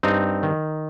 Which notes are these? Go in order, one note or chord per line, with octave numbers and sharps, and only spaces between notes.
G2 C4 D#4
D#3